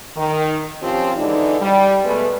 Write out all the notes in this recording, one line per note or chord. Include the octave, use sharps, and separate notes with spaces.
D#3
F3 C4 C#4 F4 G4
D3 E3 G#3 D4 D#4
G3
B2 G#3 A3 B3 B4